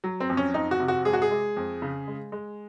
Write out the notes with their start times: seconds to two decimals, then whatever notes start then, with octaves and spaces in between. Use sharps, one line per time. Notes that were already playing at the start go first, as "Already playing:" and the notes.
0.04 F#3
0.20 C4
0.30 F2
0.37 C#4
0.54 F2 D#4
0.71 F#4
0.80 C3
0.88 F#4
1.05 G#3 G#4
1.13 F#4
1.22 G#4
1.31 G#3
1.57 F2
1.82 C#3
2.07 G#3
2.32 G#3